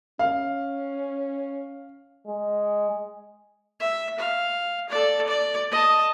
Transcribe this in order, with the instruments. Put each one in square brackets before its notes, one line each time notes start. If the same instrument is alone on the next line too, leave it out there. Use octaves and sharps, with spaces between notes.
[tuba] C#4 [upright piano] F5
[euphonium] G#3
[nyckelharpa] E5
F5
A4 D5
D5
D#5 A5